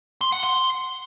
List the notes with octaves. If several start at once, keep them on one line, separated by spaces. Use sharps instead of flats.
C6
F#5
C6